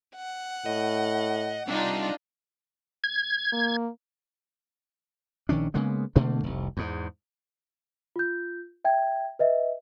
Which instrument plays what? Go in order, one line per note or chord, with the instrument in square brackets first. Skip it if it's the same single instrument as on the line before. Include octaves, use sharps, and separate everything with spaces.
[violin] F#5
[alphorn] A2 [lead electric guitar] D#5
[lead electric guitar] G3 C4 [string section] D4 D#4 F4
[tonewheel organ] G#6
[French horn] A#3
[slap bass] A#1 D#3 C#4 D4
C#3 G#3 A#3 B3
B2 D3 A3 A#3
F1 C2
E2 G#2
[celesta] F4 G6
E5 G5 G#6
B4 D#5 E5